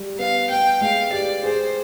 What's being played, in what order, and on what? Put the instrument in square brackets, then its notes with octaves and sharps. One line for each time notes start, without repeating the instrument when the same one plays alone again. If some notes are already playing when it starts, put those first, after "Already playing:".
Already playing: [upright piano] G3
[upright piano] B3 [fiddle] F5
[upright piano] B3 [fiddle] G5
[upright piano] G#3 [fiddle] F5
[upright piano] G4 [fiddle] D5
[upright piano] G#4 [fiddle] C5